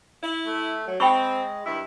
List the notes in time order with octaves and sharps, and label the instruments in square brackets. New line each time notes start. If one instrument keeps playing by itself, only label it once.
[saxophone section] E4
[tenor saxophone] A3
F#3
[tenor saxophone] G#3 [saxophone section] C4 [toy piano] G5 B5 C#6
[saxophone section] G2 D#3 [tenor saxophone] E4